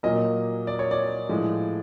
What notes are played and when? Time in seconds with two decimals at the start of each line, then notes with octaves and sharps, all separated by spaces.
0.03 A#2 F#3 A#3 D#5
0.67 D5
0.79 C#5
0.91 D5
1.29 A2 F3 G#3